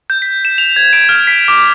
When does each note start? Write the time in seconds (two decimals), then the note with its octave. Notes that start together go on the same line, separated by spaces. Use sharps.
0.10 G6
0.22 B6
0.45 E7
0.58 F7
0.76 G#6
0.93 D7
1.09 F6
1.27 B6
1.48 D6